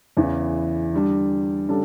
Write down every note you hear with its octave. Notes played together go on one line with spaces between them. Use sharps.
E2 C#3 E3
D3 G3 D4
C#3 G3 D4 A4